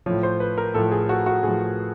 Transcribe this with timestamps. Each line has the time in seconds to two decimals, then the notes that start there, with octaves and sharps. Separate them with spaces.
0.06 A2 F3 C#5
0.23 C5
0.40 B4
0.58 A#4
0.74 A2 F3 A4
0.92 G#4
1.09 F#4
1.26 F#4
1.43 A2 F3 G#4